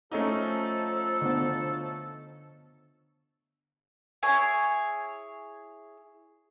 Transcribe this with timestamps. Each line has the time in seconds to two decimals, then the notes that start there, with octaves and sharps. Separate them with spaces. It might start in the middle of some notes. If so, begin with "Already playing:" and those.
0.12 F3 A3 C#4 D#4 A4
1.22 D3 B3
4.23 E4 G#4 C#5